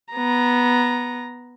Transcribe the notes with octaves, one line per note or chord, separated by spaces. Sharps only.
B3 A#5